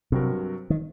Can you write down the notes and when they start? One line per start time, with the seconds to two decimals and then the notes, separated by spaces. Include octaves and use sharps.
0.12 G2 C3 F#3 C4 F#4 A#4
0.70 D#3